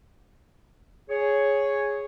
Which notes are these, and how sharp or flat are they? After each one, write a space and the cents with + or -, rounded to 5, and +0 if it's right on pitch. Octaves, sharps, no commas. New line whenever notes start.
G#4 +0 C#5 +0